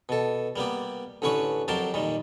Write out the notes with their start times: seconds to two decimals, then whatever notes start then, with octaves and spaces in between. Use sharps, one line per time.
0.09 B2 A4
0.56 G3 A#3 B3 G4
1.22 A1 D3 C#4 B4 C#6
1.68 F2 F#3 G4 A#4 A5 C6
1.94 A#2 D#3 G3